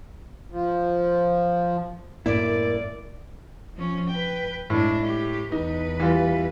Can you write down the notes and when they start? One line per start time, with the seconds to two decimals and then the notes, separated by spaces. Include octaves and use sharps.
0.52 F3
2.26 F#2 A2 A#3 E4 A#4 D5
3.76 F3 C#4
4.09 B4 G5
4.70 A2 G#3 D4
5.06 G4
5.52 E2 D#4 B4
6.00 E3 G3 F4